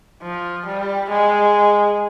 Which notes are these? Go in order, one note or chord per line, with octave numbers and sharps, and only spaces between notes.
F3
G3
G#3